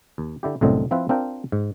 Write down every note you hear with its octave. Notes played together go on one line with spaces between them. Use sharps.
D#2
D3 E4 G4
C2 F#2 A2 D3 C4 D#5
F3 C4 E4 F4 B4
C4 D4 F4 A#4 G5
G#2